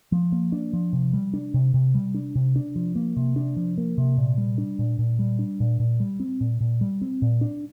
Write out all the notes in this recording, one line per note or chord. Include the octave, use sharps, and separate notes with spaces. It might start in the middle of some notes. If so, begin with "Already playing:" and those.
F3
A#3
D4
F3
C3
G3
D4
C3
C3
G3
D4
C3
D4
F3
A#3
C3
D4
F3
A#3
C3
A#2
G3
D4
A#2
A#2
G3
D4
A#2
A#2
G3
C4
A#2
A#2
G3
C4
A#2
D4